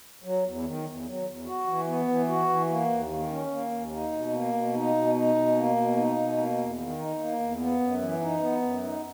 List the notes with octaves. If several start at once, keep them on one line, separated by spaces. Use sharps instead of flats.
F#3
E2
D#3
E2
F#3
E2
F#4
E3
B3
E3
F#4
E3
A#3
D#2
D#3
C#4
A#3
D#2
D#4
B2
A#3
B2
D#4
B2
D#4
B2
A#3
B2
D#4
B2
A#3
E2
D#3
D#4
A#3
E2
B3
F#2
E3
D#4
B3
F#2
D#4